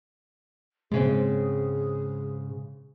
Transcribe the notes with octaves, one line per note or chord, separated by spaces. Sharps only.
G#2 C#3 G#3 C4 G#4